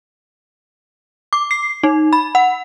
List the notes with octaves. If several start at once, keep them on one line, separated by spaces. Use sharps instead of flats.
D6
C7
D#4
B5
F#5